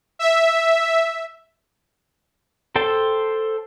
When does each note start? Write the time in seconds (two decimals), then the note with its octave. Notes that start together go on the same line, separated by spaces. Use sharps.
0.19 E5
2.76 A4 C5 G5 A5